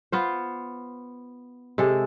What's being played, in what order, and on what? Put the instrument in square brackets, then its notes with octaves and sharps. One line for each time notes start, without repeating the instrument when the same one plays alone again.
[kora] B3 F4 C5
C3 G#3 A4